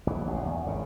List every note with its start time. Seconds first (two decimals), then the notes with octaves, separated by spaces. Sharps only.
0.07 A#1 D#2 E3
0.27 A1 C#3
0.45 E2
0.66 G#1 C#3